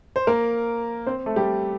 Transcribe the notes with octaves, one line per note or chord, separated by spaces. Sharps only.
C5
A#3 A#4
C4 C5
A3 A4
G3 G4